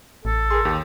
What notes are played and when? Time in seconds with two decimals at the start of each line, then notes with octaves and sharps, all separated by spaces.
0.25 A1 A4
0.51 G#4 A#4 C6
0.65 D#2 G4